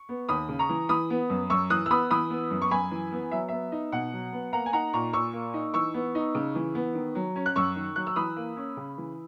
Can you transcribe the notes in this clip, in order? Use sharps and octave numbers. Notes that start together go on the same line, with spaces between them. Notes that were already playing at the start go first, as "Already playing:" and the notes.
Already playing: C#6
B3
D#2 B5 D#6
C#3
A#5 C#6
E3
E3 B5 D#6
B3
F#2
F#2 C#6 E6
E3 D#6 F#6
E6
B3 B5 D#6
E3 B5 D#6
B3
F#2
C#6
F#2 G#5 B5
E3
B3
F#3 E5
B3 E5
D#4
B2 F#5
F#3
B3
A#3 F#5 A#5
G#5
D#4 F#5 A#5
A#2 A#5 C#6
A#2 C#6 E6
A#3
D#4
E3 C#6 E6
B3
D#4
C#3
E3
B3
D#3
F#3
C#4
F#6
F#2 C#6 E6
D#3
F#3 F#6
E6
E3 B5 D#6
A#3
C#4
C#3
E3